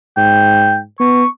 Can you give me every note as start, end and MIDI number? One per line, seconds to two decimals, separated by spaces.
0.17 0.83 44
0.17 0.77 79
1.00 1.24 59
1.00 1.28 85